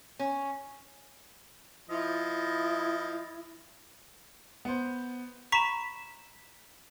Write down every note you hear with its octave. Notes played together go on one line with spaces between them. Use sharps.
C#4
F3 E4 D#5
B3 C5
A#5 B5 C#6 B6 E7